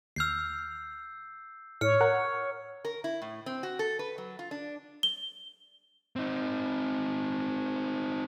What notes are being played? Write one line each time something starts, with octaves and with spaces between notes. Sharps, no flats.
D#2 E6 F6 G6 C7
A2 C#5 F6 C#7
A#4 F#5
A#4
E4
A2
C4
F#4
A4
B4
F#3
F4
D4
G7
C4 D#4